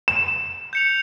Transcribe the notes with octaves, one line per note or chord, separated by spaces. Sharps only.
E7
G6 C#7 F7